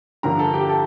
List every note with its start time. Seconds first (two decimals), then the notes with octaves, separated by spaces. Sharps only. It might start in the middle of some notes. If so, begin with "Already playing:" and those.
0.23 G2 D3 F3 A#4 A#5
0.39 A4 A5
0.54 G4 G5
0.69 A4 A5